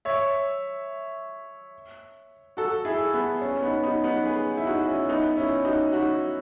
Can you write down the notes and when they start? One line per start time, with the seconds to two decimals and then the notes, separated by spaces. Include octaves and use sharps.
0.05 C#5 E5
2.57 F#4 A4
2.85 E4 G#4
3.14 B3
3.41 C#4
3.62 B3 D#4
3.83 B3 D#4
4.04 B3 D#4
4.25 G#4 B4
4.57 E4
4.67 D#4 F#4
4.88 C#4 E4
5.09 B3 D#4
5.37 C#4 E4
5.65 D#4 F#4
5.93 D#4 F#4